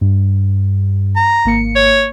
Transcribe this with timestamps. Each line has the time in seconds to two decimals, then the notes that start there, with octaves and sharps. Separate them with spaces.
0.01 G2
1.16 A#5
1.45 G#1 A#3 C#7
1.76 C#5